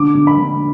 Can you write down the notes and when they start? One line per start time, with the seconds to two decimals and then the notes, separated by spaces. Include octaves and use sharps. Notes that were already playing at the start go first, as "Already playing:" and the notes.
Already playing: D3 D6
0.15 D3
0.27 B5
0.38 D3